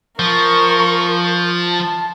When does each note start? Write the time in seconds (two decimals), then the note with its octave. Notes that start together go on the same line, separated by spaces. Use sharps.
0.19 F3 A#4 C#6
1.64 A5